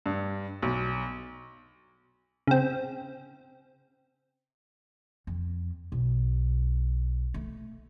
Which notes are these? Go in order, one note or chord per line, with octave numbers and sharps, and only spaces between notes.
G2
B1
C#3 C4
F2
B1
A3